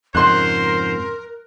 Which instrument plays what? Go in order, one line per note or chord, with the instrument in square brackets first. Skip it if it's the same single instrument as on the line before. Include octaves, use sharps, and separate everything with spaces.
[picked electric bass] F2 G#2 C#3 [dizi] A#4 [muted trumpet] C5 [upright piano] C6 F#6